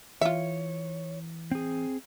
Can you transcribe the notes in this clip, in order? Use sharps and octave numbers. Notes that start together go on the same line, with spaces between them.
E3 F4 C#5 E5
C4 G#4